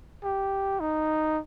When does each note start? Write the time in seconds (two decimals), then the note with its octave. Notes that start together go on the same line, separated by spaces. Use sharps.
0.24 G4
0.80 D#4